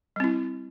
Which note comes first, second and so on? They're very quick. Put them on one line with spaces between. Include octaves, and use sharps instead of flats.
G3 C4 E4